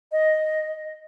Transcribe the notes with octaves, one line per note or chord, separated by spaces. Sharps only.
D#5